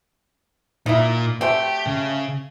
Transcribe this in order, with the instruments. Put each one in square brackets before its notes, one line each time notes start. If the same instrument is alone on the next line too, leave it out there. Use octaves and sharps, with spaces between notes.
[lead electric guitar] A#2 [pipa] D#4 E4
[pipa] F#3 A3 C4 [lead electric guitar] G4
[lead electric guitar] C#3